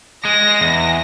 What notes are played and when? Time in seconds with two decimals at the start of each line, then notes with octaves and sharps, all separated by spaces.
0.25 G#3 A#6
0.61 E2